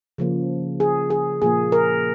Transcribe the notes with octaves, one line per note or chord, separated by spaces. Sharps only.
C#3 F3 A#3
G#4
G#4
A#2 F3 A#3 G#4
A#4